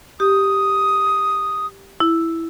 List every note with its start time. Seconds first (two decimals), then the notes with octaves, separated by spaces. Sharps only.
0.20 G4 D#6
2.00 E4